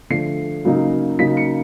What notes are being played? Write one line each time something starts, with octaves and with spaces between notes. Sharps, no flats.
D3 F3 A3 C7
C#3 F#3 A#3 D#4
C#3 F#3 A#3 D#4 B6
C#7